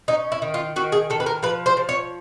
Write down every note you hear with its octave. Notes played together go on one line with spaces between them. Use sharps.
C#4 D#4
E4
D#3
F4
D#3 F#4
G#4
D#3 A4
B4
A#4
F3 B4
C5
F3
C#5